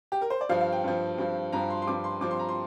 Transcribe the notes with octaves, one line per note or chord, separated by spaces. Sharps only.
G4
A#4
C5
D5
G2 F3 F5
F5
G5
G2 F3
G2 F3
G2 F3 A#5
C6
C6
G2 F3 D6
C6
G2 F3 D6
C6
A#5
C6